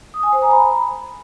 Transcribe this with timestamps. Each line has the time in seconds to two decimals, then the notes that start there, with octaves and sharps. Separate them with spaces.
0.14 D#6
0.23 G#5
0.33 C5
0.42 A#5
0.51 B5